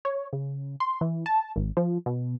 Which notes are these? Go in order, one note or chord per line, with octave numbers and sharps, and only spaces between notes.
C#5
C#3
C6
E3
A5
G#1
F3
B2